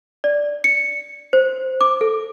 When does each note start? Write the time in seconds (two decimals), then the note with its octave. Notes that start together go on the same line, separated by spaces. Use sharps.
0.24 D5
0.64 C#7
1.33 C5
1.81 D6
2.01 A4